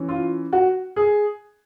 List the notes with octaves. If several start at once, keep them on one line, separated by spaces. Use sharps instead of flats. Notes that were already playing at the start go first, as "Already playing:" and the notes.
Already playing: E3 C#4
F4
F#4
G#4